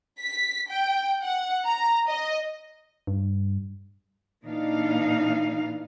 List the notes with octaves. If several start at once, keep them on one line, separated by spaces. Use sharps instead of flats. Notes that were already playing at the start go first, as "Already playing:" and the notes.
B6
G5
F#5
A#5
D#5
G2
A#2 E3 D4 D#4 F5